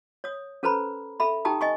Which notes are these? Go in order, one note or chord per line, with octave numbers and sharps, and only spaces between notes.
C#5 D#6
C#4 A4 B4 C5 A#5 B5
A4 E5 B5
D#4 G4 G5 A5 A#5 D#6
D#5 G#5 C#6